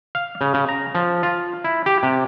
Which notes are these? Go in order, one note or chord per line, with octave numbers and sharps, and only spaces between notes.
F5
C#3
C#3
A#5
F3
F4
E4
G4
C3